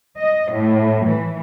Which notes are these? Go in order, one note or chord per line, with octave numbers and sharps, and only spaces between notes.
D#5
A2
E3